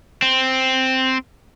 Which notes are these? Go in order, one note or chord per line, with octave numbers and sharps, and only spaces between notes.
C4